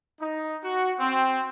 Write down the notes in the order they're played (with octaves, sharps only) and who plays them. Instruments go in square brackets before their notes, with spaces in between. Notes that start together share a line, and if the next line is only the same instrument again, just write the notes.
[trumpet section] D#4
F#4
C4